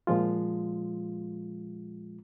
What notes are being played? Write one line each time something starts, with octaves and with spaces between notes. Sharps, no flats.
A#2 F3 G#3 F4